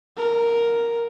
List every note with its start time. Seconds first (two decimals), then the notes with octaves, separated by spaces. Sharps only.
0.17 A#4